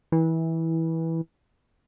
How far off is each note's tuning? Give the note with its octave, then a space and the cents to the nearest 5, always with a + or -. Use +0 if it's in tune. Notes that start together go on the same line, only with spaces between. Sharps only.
E3 -20